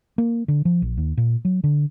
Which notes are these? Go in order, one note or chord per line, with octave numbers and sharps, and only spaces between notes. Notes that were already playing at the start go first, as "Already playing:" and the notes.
A#3
D3
F3
A#1
D#2
A#2
F#3
D3